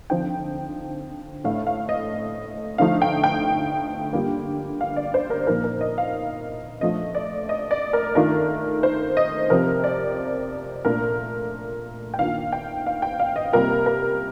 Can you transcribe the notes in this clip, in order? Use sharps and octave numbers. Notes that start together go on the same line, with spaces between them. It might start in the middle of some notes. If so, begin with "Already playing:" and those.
D3 F3 C4 D#4 G5
A2 A3 D4 F5
F5
D#5
D3 F3 A3 D#4 F5
G5
G5
D3 G3 A#3 F4
F5
D5
C5
A#4
A#2 F3 A#3 D#4 A#4
A#4
D#5
F5
F3 A3 D4 F4 D#5
D5
D#5
D5
A#4
D#3 A3 D4 F4 A#4
C5
D#5
C3 F3 C4 A#4
D5
A#2 A3 D4 F4 A#4
G5
D#3 A#3 D4 F4 F5
G5
F5
G5
F5
D#5
C3 G3 A#3 F4 A#4
A#4